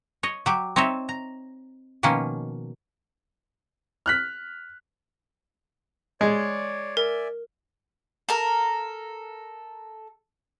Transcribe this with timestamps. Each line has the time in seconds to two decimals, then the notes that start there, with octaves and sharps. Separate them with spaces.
0.23 C#5 D#5
0.46 F#3 G4
0.76 C4 D#4 C#5 D#5 E5
1.09 A#5
2.03 B2 D#3 F3 A#3 C#4
4.06 F6 F#6 B6
6.21 G#3 C#5 D5
6.97 A#4 D5 E5 G#5
8.29 A4 A#4